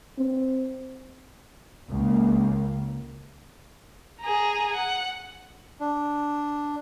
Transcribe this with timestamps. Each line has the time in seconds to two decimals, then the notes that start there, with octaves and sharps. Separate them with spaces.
0.19 C4
1.91 C#2 A#3
4.21 G#4 A#5
4.74 F#5
5.80 D4